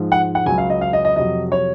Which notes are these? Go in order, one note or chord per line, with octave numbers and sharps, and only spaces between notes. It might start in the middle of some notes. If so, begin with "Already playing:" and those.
Already playing: G#2 F3 G#3
F#5
F#5
C#2 C#3 F#3 G#5
F5
D#5
F5
D#5
D#5
F2 C3 F#3 D#5
C#5